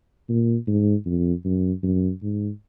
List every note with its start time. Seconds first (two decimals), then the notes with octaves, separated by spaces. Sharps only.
0.29 A#2
0.67 G#2
1.06 F2
1.45 F#2
1.83 F#2
2.22 G#2